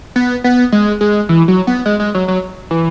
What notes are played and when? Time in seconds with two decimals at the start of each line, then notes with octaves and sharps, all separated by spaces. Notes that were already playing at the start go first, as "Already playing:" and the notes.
0.16 B3
0.44 B3
0.72 G#3
1.01 G#3
1.29 E3
1.48 F#3
1.67 B3
1.86 G#3
2.00 G#3
2.15 F#3
2.28 F#3
2.71 E3